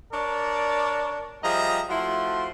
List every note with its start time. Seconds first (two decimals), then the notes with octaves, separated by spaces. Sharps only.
0.13 D4 A#4 C#5 D5
1.43 F3 G3 G#4 D#5 E5 A#5
1.89 F3 A3 E4 F#4 C6